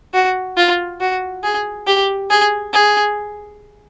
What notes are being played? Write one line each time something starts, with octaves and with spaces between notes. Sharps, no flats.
F#4
F4
F#4
G#4
G4
G#4
G#4